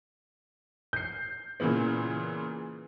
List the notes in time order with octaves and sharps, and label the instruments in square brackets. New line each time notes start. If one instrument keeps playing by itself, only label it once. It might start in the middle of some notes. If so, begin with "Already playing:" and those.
[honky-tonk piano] G6 C7
A#2 C#3 E3 A#3 B3